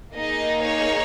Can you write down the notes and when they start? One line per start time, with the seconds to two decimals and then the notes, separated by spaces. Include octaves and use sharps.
0.17 A#3 D#4 G#4 D#5
0.63 C#5